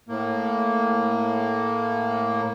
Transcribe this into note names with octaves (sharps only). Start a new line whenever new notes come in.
A2 A#3